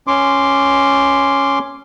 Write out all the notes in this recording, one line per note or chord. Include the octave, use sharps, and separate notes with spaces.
C#4 C6 D6